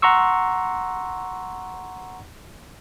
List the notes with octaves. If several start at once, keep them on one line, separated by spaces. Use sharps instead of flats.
F#5 A#5 C6 C#6 E6